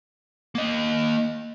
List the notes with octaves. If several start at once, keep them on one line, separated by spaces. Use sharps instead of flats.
A#3 D#5